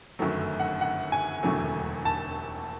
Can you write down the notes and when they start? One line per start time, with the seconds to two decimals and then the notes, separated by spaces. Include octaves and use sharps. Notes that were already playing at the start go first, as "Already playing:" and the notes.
0.19 G1 F#2 D#3 F#3 A3
0.60 F#5
0.81 F#5
1.12 G#5
1.43 E1 D#2 D3 F#3 A3
2.05 A5